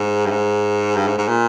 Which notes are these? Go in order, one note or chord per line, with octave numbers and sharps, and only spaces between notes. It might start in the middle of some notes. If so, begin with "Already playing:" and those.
Already playing: G#2
G2
G#2
G2
G#2
G#2
A#2